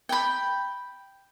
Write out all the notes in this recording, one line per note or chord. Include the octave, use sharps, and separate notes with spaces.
G5 B5